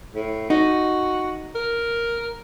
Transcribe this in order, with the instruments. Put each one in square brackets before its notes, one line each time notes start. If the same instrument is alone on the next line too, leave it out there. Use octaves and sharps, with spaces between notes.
[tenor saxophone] A2
[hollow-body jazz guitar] D#4 [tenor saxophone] F#4
[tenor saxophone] A#4